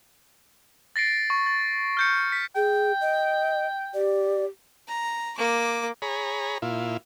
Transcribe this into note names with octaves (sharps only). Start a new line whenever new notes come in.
A6 A#6 C7 D7
C#6
A6
F6 G6 C#7
B6
G#4 G5
D#5
G4 D5
A#5
A#3 D6
G#4 C#5 A#5 B5
A#2 E4 F4